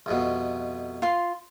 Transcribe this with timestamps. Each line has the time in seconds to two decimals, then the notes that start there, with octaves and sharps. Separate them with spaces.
0.06 C2 F2 B2
1.02 F4 C6